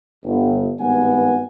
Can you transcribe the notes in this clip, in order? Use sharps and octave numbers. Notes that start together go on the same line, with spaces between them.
G1
G#1 G2 B3 F#5 G#5